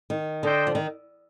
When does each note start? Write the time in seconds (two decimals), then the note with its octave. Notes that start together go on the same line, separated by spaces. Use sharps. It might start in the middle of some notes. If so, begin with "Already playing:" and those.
0.10 D#3
0.43 D3 D4 A4 C5 D#5 G5
0.67 F3
0.75 D#3